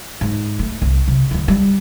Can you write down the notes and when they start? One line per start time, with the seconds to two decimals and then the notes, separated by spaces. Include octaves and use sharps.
0.21 G#2
0.59 A3
0.82 C2
1.08 C3
1.31 D2 D3
1.48 G3